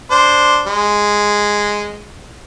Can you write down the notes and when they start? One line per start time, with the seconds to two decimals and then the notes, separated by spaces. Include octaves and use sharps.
0.11 D4 C5
0.66 G#3